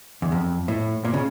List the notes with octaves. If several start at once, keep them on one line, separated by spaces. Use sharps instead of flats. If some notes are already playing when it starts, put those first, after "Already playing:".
E2
F2
A2
A#2
C#3